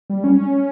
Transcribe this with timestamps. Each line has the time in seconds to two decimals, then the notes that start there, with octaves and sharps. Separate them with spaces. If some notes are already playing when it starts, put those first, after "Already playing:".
0.10 G3
0.24 C#4